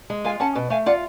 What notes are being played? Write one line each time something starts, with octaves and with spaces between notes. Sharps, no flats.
G#3
F4 F5 G#5
C#4 F#5 A5
B2
A3 F5 G#5
F4 D5 F#5